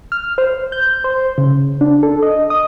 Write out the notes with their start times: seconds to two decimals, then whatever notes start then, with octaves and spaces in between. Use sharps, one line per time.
0.12 F6
0.38 C5
0.72 G6
1.04 C5
1.38 C#3
1.81 D4
2.03 A4
2.22 D#5
2.50 D#6